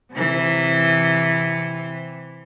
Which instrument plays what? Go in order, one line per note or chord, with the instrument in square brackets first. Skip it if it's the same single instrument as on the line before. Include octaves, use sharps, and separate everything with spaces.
[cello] C3 E3